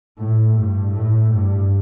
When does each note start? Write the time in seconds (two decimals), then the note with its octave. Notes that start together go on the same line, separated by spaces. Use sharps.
0.19 A2
0.56 G2
0.93 A2
1.31 G2